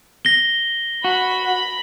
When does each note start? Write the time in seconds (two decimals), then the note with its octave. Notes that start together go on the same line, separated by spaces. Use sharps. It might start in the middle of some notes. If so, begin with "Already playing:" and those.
0.25 A#6 G7
1.04 F#4 B5